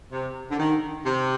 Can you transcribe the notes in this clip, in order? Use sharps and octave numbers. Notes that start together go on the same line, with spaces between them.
C3
D3
D#3
C3